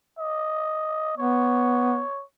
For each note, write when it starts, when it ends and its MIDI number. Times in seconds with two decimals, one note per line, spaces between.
0.19 1.15 75
1.18 2.01 59
1.18 2.23 73